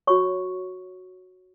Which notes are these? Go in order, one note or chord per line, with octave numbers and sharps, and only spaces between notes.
F#4 C#5 C#6